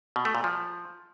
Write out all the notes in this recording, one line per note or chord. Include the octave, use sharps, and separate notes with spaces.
B2
A3
A#2
F3